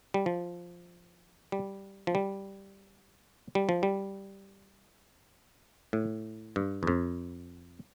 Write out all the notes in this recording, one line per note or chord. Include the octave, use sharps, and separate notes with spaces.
G3
F3
G3
F3
G3
G3
F3
G3
A2
G2
E2
F2